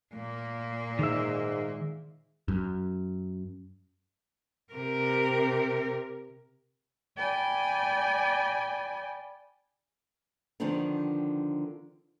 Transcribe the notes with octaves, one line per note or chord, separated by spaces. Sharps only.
A#2 A#3
G#2 D#3 E5
F#2
C3 A#4
D5 G5 G#5 B5
D3 D#3 F3 B3 C4 D4